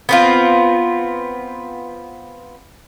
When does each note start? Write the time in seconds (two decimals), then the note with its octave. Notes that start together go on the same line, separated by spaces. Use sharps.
0.09 B3 C4 F4